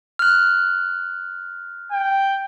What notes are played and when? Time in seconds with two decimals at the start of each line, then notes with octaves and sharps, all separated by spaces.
0.19 F6 F#6
1.92 G5